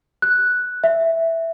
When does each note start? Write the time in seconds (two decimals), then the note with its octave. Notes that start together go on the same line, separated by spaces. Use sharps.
0.22 F#6
0.84 E5